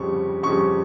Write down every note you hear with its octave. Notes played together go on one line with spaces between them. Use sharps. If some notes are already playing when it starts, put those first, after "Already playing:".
Already playing: F2 C#3 G3 C#6
F2 C#3 G3 C#6